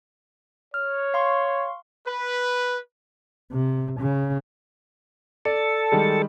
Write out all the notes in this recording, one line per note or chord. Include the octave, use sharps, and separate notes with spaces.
C#5 F6
F5 C6 C#6
B4
C3
C#3
A4 D5
D#3 G3 G#3